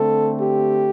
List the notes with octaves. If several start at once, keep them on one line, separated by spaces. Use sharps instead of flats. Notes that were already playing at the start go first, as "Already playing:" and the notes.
Already playing: D3 A3 C4 A4
G4